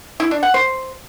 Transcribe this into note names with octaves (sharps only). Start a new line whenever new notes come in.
E4
D4
F#5
C5